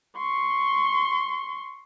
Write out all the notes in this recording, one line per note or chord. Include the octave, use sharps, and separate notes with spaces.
C6 C#6